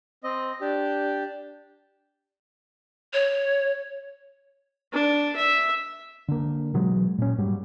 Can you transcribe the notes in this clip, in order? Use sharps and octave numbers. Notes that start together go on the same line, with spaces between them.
C4 D#5
D4 G4
C#5
D4
E5
D3 A#3
B2 E3 F#3 G#3
A#2 C#4
G#2 F#3 G3